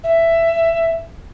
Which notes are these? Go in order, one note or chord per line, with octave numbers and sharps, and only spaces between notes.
E5